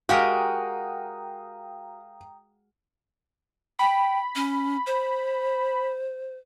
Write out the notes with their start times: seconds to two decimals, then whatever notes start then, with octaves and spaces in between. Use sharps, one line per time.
0.09 G#3 F#4 G4 A#4 F5 G5 A#5 D#6
3.79 G5 B5
4.35 C#4
4.87 C5